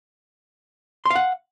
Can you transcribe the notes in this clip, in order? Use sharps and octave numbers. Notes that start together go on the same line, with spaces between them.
F5 F#5 C6